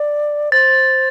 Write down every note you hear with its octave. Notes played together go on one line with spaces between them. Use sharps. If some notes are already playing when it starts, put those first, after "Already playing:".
Already playing: D5
C5 A6